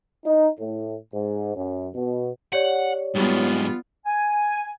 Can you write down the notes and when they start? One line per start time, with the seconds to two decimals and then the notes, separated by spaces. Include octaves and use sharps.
0.24 D#4
0.59 A2
1.13 G#2
1.55 F#2
1.95 B2
2.53 G4 C#5 D5 F#5
3.15 G#2 F#3 G3 B3 F4
4.06 G#5